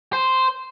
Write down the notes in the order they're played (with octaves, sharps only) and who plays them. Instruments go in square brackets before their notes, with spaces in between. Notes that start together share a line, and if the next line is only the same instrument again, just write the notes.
[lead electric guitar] C5